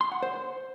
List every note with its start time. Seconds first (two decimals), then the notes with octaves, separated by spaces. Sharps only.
0.01 C6
0.12 F#5
0.23 C5